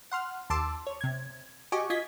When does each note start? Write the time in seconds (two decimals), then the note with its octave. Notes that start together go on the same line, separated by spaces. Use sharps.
0.11 F#5 C6 F6
0.50 D#2 A5 C6 D6 E6
0.87 C#5
1.01 C3 G#6
1.72 F#4 G4 D#5 G#5 C#6 D6
1.90 F4 D#5 G#6 B6